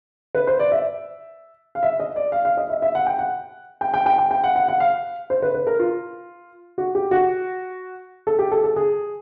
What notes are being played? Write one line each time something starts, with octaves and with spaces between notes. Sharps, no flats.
B4
C5
D5
E5
F5
E5
D#5
D5
F5
F5
D#5
E5
E5
F#5
G5
F#5
G5
G5
G5
G5
G5
F#5
F#5
F#5
F5
C5
B4
B4
A#4
F4
F#4
G4
F#4
A4
G4
A4
A4
G#4